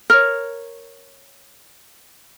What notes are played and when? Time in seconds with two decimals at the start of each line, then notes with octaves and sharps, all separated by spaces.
0.10 A#4 C#5